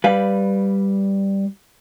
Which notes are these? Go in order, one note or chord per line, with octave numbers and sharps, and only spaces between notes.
G3 B4 F5